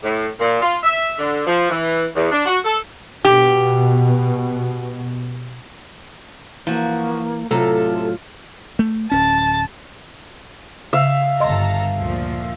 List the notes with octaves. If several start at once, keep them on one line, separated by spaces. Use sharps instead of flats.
A2
A#2
F4
E5
D3
F3
E3
E2
D4
F#4
A4
B2 G4
E3 F3 A#3 F#4
A2 C3 F#3 A3 F4 A4 A#5
A3
D1 C#4 A5
C#3 E5 F5
G1 A4 D#5 A#5 C6
D2 A#2 F3